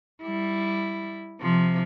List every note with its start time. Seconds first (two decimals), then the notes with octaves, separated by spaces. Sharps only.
0.23 G3 E4
1.41 C3 F3